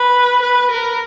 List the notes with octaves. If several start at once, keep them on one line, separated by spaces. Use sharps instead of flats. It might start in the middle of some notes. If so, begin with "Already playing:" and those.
Already playing: B4
B4
A#4